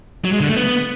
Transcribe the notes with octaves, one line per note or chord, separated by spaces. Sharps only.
F#3
G#3
D3
A3
B3